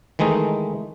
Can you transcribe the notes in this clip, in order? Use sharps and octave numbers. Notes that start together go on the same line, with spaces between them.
D#3 E3 G#3 A3 D#4